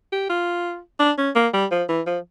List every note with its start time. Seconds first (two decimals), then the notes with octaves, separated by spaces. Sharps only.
0.12 G4
0.30 F4
1.00 D4
1.18 C#4
1.36 A#3
1.54 G3
1.71 F3
1.89 E3
2.06 F3